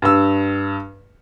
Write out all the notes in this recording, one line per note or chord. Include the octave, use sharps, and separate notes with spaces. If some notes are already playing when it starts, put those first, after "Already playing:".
G2 E6